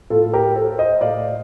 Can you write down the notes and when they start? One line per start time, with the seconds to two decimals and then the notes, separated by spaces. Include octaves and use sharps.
0.10 A2 F4 A4
0.33 G4 A#4
0.56 A4 C5
0.78 C5 D#5
1.01 A2 D5 F5